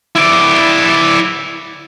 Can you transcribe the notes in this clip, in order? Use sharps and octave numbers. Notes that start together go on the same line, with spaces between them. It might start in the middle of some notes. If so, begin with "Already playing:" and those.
E4 D5